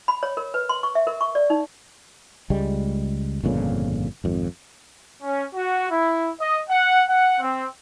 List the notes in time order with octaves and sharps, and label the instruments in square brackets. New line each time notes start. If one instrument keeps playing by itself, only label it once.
[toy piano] B5
C#5
A#4
B4
C6
C#6
E5
A#4
C#6
D5
D#4
[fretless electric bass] C#2 G3 G#3
G1 F2 A#2 C#3
G#1 F2
[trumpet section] C#4
F#4
E4
D#5
F#5
F#5
C4